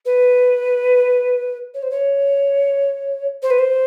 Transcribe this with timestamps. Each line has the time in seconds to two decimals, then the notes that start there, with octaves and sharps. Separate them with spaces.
0.05 B4
1.74 C#5
1.82 C5
1.90 C#5
3.42 C5
3.50 B4
3.58 C5